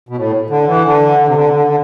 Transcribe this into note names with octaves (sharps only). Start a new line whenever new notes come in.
B2
A2
D3
E3
D3
D3
C3
D3
D3
D3